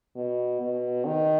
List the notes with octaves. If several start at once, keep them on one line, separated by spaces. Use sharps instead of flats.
B2
B2
D#3